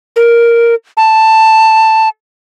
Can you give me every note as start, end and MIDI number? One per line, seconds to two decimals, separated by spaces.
0.16 0.75 70
0.97 2.09 81